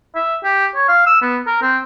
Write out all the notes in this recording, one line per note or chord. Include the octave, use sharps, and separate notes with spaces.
E5
G4
C#5
F5
E6
B3
A#4
C4